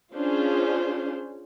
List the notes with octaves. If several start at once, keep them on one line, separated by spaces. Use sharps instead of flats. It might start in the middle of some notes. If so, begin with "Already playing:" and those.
C#4 D4 F4 G#4 C5